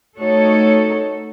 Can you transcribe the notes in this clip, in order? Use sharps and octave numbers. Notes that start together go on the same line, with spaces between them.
A3 D#4 F#4 A4 C#5